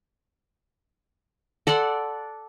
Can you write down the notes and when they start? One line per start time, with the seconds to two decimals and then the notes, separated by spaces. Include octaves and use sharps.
1.67 A4 D5 F#5 C6